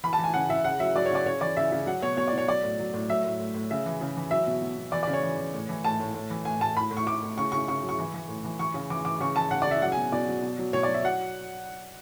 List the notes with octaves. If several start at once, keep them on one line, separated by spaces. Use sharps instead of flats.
E3 B5
A5
E3
G#5
C#3 F#5
C#3 E5
C#3 F#5
F#3 E5
F#3 D5
C#5
C#3 D5
C#3 C#5
E3 D5
C#3 E5
C#3
F#3 F#5
B2 C#5
B2 C#5
D5
B2 C#5
F#3 D5
A2
F#3
A2
F#3 E5
A2
A2
A2
C#3 E5
E3
C#3
E3
F#3 E5
B2
B2
B2
E3 D5
D5
C#3
C#5
E3
E3
A2
E3
A2 A5
A2
A2
E3
A2 G#5
A2 A5
A2 B5
A2
C#6
A2 D6
A2
C#3 C#6
C#3 C#6
C#3 C#6
F#3
C#6
E3
E3
A2
E3
E3 C#6
C#3
E3 D6
E3 D6
C#3 C#6
E3 A5
C#3 F#5
D5
C#3 E5
F#3 F#5
G#5
B2
B2 D5
F#3
B2
F#3
B2 C#5
D5
F#3
E5
F#3 F#5